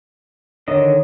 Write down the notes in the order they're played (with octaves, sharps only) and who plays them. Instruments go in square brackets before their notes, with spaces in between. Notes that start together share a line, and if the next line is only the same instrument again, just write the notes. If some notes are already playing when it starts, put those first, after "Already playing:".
[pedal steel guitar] D3 D#3 D#5 [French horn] C#5